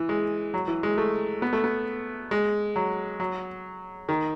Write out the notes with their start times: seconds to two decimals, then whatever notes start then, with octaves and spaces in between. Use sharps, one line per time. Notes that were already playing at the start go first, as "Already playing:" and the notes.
Already playing: E3
0.09 G#3
0.54 F#3
0.68 E3
0.83 G#3
0.98 A3
1.42 B3
1.53 A3
1.64 B3
2.31 G#3
2.76 F#3
3.20 F#3
4.09 D#3